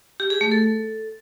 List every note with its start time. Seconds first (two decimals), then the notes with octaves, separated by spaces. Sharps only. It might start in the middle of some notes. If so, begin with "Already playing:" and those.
0.20 G4
0.30 G#4
0.41 A3
0.52 A4